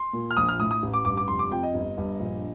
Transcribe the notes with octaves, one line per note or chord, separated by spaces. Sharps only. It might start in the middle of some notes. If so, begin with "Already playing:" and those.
Already playing: C6
A#2
F6
A#1 D#6
F6
A2 D#6
D#6
A1
D6
G2 D6
D6
F1 C6
D6
F2 G5
D#5
G1
G2
A#1